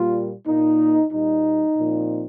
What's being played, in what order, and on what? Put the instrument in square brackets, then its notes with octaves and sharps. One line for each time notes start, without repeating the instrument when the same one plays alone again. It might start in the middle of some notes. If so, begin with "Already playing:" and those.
Already playing: [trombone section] A#2 G3 A#3 F4
A#2 A#3 D#4
A#2 G3 A#3 D#4
A#2 F3 C4